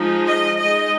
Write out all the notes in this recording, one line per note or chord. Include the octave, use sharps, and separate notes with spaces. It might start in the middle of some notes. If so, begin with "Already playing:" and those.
Already playing: F3 G#3 D#4
D#5
G#3 D#4 D#5